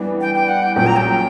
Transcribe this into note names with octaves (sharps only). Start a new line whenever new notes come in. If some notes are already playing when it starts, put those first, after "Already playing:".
Already playing: E3 G3 B3 D4
G5
G5
F#5
G5
A#1 A#2 F#3 C#4 G5
A#5
G5